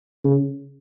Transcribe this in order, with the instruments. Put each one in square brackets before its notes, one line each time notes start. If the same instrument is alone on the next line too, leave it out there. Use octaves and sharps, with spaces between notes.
[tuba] C#3